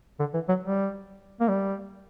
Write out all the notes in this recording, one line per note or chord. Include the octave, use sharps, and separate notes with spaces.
D3
E3
F#3
G3
A#3
G3